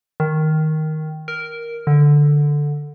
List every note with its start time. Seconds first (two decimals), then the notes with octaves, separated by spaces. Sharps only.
0.20 D#3
1.28 A#4
1.87 D3